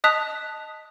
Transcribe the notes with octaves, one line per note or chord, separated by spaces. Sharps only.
D#5 A5 D#6 F#6 B6 F7